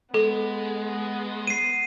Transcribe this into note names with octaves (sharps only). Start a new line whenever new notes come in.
G#3 B3 A4
C7 D#7